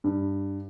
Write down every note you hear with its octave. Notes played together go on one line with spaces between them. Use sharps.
G2